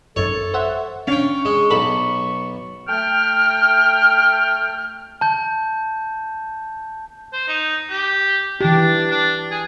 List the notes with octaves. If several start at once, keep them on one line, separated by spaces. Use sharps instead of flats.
G#1 F#2 A4 C#5
C5 E5 F#5
C#4 D4 F5 G5 C#6
G#3
B1 A4 B5
A3 G5 F6
A5 G6
C5
D#4
G4
E3 D4 G4
D4
G#4